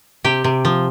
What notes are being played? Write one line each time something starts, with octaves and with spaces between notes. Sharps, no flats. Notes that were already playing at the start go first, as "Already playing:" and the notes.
C3 G4
C3
F3